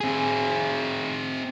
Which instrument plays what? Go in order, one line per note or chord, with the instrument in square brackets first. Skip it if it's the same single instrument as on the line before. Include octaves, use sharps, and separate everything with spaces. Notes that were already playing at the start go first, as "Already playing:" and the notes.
[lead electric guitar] C4 G#4